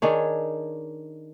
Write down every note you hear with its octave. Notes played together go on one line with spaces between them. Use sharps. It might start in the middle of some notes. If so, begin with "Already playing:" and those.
D#3 D4 G#4 C#5